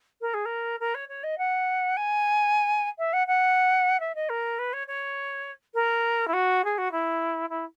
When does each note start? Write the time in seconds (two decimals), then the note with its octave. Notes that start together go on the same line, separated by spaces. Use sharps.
0.21 A#4
0.34 G#4
0.45 A#4
0.80 A#4
0.95 C#5
1.09 C#5
1.24 D#5
1.38 F#5
1.97 G#5
2.99 E5
3.13 F#5
3.27 F#5
4.00 E5
4.15 D#5
4.29 A#4
4.59 B4
4.73 C#5
4.88 C#5
5.75 A#4
6.28 E4
6.33 F#4
6.64 G#4
6.78 F#4
6.92 E4
7.50 E4